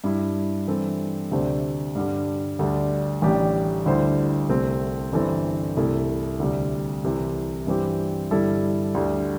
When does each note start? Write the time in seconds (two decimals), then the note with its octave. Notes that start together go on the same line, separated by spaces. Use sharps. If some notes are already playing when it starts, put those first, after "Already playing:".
0.04 G2 G3 E4
0.68 G2 E3 C4 A4
1.31 D2 C3 A3 D4 C5
1.95 G2 D3 G3
2.59 D2 D3 G3 D4
3.22 A1 A2 G3 D4 G4
3.86 D2 D3 G3 E4 C5
4.49 C2 C3 A3 C4
5.13 G1 G2 E3 C4 A4
5.76 C2 C3 A3 E4 A4
6.40 D2 C3 G3
7.04 C2 C3 E3
7.67 G2 E3 C4 G4
8.31 G1 G2 G3 E4 A4
8.94 D2 D3 G3